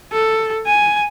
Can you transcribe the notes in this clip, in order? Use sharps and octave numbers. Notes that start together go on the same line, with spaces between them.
A4
G#5